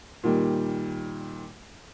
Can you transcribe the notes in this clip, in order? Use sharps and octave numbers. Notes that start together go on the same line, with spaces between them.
A#2 D#3 G3